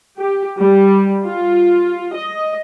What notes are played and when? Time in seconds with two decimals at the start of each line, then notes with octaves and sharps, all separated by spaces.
0.19 G4
0.59 G3
1.25 F4
2.14 D#5